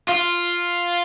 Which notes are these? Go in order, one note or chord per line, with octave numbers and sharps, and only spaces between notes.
F4